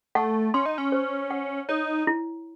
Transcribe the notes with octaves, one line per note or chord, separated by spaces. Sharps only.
A3 F#5
C#4 C6
D#4
C#4
C5
F#5
D#4 C#5
E4